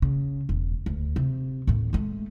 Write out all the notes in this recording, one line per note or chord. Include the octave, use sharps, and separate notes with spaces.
C#3
E1
D2
C3
D#2 A2
G#3 A3